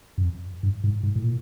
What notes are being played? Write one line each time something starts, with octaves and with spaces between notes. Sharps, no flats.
F#2
F2
G2
G#2
G#2
A2
A#2